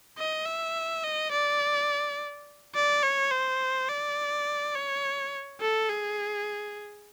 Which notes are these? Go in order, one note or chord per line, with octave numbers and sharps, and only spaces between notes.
D#5
E5
D#5
D5
D5
C#5
C5
D5
C#5
A4
G#4